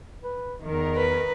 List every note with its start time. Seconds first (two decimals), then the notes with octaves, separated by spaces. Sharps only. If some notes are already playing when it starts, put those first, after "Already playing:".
0.23 B4
0.63 E2 D#3 A#4
0.96 B4